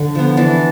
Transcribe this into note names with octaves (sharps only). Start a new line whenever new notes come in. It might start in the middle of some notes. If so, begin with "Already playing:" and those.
Already playing: D3
F3 B3
E3 D4